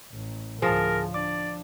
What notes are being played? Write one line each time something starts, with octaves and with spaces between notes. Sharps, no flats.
A1
D2 A2 F3 G#4 A#4 A5
D4 D5 D6